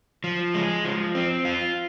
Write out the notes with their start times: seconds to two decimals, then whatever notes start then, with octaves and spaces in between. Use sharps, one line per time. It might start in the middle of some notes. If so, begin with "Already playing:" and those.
0.24 F3
0.54 G#3
0.85 F3
1.15 C4
1.45 F4